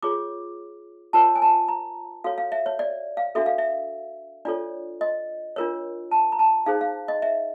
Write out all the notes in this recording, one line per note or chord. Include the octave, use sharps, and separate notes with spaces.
F4 G#4 C#5 D6
F4 A#4 C#5 A5
G#5
A5
A#5
F#4 A4 C#5 F5
F5
E5
C#5
D5
F5
D4 F#4 A4 E5
F5
E5
D4 F4 A4 C#5 D5
D#5
D4 F4 A#4 C#5
A5
A#5
A5
D#4 G#4 C5 F5
F5
D#5
E5